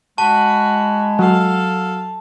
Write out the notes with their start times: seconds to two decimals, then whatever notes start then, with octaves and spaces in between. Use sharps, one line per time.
0.18 G#3 F#4 A5 B5
1.19 F#3 A4 F5